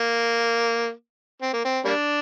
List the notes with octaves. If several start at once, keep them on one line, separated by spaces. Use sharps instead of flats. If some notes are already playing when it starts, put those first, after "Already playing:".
Already playing: A#3
C4
A#3
C4
G3 A#3 D4